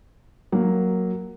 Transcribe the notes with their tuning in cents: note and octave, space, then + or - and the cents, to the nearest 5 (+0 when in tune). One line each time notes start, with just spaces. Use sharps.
F#3 +0 A#3 +0